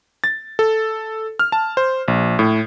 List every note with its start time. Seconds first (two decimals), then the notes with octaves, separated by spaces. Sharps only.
0.24 A6
0.59 A4
1.39 F6
1.52 A5
1.77 C5
2.08 A#1
2.39 A2